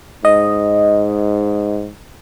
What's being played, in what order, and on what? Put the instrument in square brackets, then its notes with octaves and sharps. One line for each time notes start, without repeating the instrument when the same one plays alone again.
[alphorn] G#2 [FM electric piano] D#5